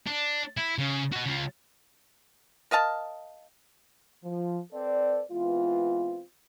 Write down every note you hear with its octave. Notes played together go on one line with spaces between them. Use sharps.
D4
E4
C#3
F#4 D#5
C#3 F4
A#4 D#5 F5 A5
F3
C4 A4 B4 C5 D5
E3 G#3 B3 C4 F4